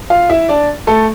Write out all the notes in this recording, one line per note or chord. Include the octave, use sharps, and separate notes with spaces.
F4 F5
E4 E5
D4 D5
A3 A4